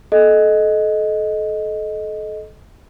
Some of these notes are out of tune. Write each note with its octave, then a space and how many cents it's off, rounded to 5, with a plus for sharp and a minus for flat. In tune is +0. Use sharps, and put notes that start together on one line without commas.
A4 -30 D#5 +0